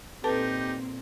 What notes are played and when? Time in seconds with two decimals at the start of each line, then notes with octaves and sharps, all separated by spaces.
0.24 A#2 C4 D#4 G4 A4 B4 A5